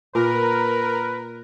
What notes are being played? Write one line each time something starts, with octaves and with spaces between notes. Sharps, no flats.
A#2 A#4 B4